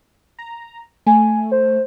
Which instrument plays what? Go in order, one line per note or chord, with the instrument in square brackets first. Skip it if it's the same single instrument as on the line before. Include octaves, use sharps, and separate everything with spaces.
[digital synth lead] A#5
[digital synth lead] A3 [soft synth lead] G#5
[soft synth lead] C5